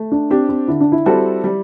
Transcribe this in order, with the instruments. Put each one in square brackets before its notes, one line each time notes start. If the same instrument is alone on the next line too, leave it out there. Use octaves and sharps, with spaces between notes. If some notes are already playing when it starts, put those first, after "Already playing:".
Already playing: [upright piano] A3
[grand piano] D4
[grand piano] C4 [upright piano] D4 G4
[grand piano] C4
[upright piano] D3 [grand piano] E4
[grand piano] D4
E4
[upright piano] G3 C4 F#4 A4
G3